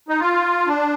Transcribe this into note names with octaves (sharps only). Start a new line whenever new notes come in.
D#4
F4
D4